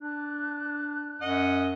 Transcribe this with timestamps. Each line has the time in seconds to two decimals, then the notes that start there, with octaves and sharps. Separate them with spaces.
0.01 D4 F#6
1.22 F#2 D#5 F#5